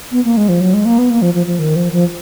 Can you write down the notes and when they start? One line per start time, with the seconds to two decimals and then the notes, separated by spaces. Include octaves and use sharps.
0.12 B3
0.24 A#3
0.37 G#3
0.49 F3
0.61 F#3
0.74 G#3
0.85 A#3
0.98 B3
1.10 A#3
1.22 F3
1.34 F3
1.47 F3
1.59 D#3
1.76 F3
1.92 F3